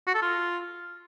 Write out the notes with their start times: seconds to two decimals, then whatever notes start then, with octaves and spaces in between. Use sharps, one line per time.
0.07 F#4
0.15 A4
0.22 F4